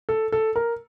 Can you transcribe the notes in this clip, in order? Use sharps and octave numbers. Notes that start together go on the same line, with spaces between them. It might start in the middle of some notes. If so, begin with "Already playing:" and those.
A4
A4
A#4